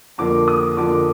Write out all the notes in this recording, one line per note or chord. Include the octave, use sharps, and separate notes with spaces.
F2 D3 F3 A#3 D6
D#6
F2 D3 F3 A#3 D6